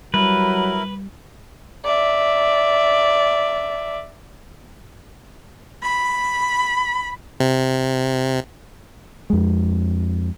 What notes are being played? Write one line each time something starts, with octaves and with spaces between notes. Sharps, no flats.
F#3 G3 E4 A#4 B4
D5 E5
B5
C3
F2 G#3